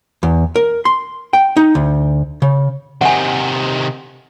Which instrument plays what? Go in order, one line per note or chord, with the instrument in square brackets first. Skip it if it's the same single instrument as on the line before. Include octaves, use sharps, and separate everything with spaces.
[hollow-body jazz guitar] E2
A#4
C6
G5
D#4
D2
C#3
[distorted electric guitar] C3 D#3 [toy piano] F#5 G#5